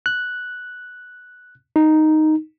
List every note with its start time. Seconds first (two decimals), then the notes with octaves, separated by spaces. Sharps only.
0.06 F#6
1.76 D#4